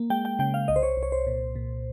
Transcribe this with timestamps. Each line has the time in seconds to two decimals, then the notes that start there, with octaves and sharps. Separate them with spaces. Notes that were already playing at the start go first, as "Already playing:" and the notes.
Already playing: A#3
0.10 G#3 G5
0.25 G5
0.39 C#3 G5
0.54 F5
0.68 C2 D#5
0.76 C5
0.83 C#5
0.97 C2
1.03 C#5
1.12 C5
1.27 A#2
1.55 A#2